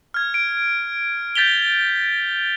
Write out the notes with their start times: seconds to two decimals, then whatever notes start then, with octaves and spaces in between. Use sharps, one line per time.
0.14 F6 G#6
0.34 D7
1.35 G6 A6 B6 F7 G7